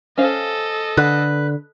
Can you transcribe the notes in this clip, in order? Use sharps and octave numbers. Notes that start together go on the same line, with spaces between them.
C#4 A4 C5 D#5 F5
D3 B4